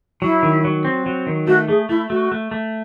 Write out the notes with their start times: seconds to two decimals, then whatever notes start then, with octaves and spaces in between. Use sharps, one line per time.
0.22 F#3 E4
0.43 D#3
0.65 F#3
0.85 C4
1.06 F#3
1.27 D#3
1.47 A3 F#4
1.68 A3 G#4
1.89 A3 E4
2.10 A3 F#4
2.32 A3
2.51 A3